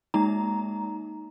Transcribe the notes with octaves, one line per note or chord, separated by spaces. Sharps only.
G#3 A#3 D#4 A#5